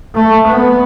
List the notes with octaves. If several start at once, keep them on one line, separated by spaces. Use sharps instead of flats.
A3
B3